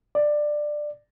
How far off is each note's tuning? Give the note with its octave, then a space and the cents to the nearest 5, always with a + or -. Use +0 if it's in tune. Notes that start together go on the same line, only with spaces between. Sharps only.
D5 +15